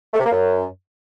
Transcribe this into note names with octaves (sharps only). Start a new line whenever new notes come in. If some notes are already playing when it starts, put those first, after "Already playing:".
A3
C3
A#3
F#2